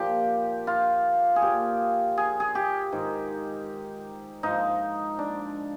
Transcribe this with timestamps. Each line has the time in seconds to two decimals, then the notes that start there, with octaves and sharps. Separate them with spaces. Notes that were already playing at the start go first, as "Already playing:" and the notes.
Already playing: A#2 F3 G4
0.67 F4
1.36 G#4
1.42 A#2 F3 G4
2.18 G#4
2.40 G#4
2.55 G4
2.92 G#2 D#3
4.43 G#2 F3 D#4
5.19 D4